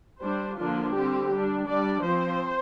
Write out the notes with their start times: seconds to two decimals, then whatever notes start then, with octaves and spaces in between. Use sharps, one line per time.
0.22 G3 D4 C5
0.58 D3 F3 A#3 D4 F4
0.95 D3 G3 C4 G4
1.31 G3 D4
1.67 G3 D4 D5
2.03 F3 C4 C5